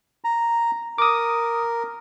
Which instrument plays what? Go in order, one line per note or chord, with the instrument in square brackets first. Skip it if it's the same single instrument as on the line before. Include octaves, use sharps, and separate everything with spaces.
[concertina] A#5
[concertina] A#4 [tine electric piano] D6 D#6